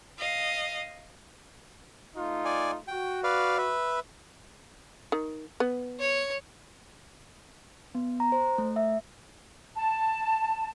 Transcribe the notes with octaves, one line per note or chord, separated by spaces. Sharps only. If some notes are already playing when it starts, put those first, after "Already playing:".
D#5 F5
A3 D#4 F4
D5 G#5
F#4 G5
B4 D5 F5
B4 E5
D#3
B3
C#5
B3
A#5
C5
A3
E5
A5